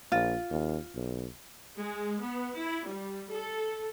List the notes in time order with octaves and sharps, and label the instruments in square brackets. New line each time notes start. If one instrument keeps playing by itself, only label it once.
[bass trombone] A#1 [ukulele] F4
[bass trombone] D#2
B1
[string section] G#3
B3
E4
G3
A4